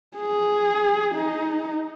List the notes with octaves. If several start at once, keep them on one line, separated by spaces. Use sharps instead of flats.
G#4
D#4